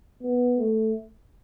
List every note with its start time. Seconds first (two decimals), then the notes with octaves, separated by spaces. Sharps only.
0.22 B3
0.58 A3